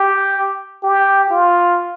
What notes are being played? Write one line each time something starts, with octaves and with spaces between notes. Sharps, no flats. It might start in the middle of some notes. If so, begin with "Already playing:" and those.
Already playing: G4
G4
F4